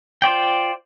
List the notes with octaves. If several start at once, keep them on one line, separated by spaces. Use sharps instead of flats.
F4 C5 D5 G5